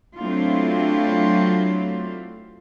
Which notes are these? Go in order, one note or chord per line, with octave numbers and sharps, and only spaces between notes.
F#3 A3 C4 D4 E4 F4